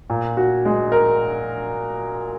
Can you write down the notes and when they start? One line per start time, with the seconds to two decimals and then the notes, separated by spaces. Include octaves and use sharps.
0.10 A#2
0.37 F#4
0.65 G#3
0.92 A#4